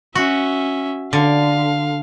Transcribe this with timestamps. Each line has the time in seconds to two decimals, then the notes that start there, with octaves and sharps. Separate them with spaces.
0.15 C#4 F#4 E5
1.13 D3 F5